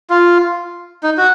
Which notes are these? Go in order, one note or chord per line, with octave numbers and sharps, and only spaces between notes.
F4
D#4
F#4